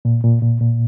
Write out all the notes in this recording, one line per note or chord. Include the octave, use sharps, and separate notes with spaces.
A#2
A#2
A#2
A#2